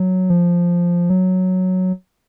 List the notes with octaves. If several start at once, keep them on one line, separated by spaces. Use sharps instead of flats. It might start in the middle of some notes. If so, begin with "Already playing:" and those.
Already playing: F#3
F3
F#3